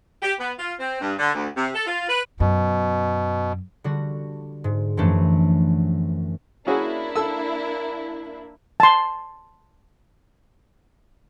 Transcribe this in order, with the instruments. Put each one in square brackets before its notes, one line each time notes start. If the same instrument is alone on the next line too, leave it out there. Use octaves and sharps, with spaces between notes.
[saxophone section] G4
B3
F4
C4
G2
D3
D2
C3
A4
F4
B4
[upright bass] F#2 [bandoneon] B2
[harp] D3 G3 F#4
G#2
F#2 E3 F3 A3 D4
[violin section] A#3 D4 E4 [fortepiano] C#4 F#4 G#4
[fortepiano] A4 E6
[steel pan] A5 C6